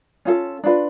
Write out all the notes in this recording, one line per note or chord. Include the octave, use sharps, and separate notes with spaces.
C#4 F4 A4
D4 F4 B4